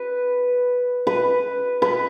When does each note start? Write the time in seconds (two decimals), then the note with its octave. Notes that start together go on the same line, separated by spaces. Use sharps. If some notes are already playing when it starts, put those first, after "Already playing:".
Already playing: B4
1.07 B4
1.82 B4